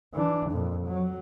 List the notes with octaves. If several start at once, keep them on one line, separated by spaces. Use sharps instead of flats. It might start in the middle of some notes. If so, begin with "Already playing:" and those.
E3 D4
F2 A#2
F#3